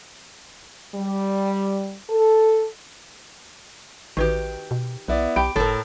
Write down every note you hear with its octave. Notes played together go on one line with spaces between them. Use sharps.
G3
A4
A1 D#3 F#4 G4 B4 C#6
B2
B1 B3 E4 D5
B1 G4 G5 B5 D7
G1 A2 A4 A#4